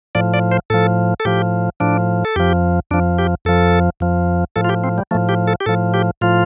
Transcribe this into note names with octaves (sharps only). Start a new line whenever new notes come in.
A2 F3 D5
D5
C5
A2 F3 A4
A4
A2 F3 G4
A2 F3 D4
A4
F2 F3 G4
F2 F3 D4
G4
F2 F3 A4
F2 F3
A2 F3 A4
F4
G4
C4
G3
A2 F3 A3
G4
A4
G4
A2 F3 A4
G4
A2 F3 F4